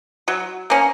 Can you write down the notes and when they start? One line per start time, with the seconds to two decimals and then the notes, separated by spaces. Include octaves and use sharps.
0.28 F#3
0.70 A#3 C#4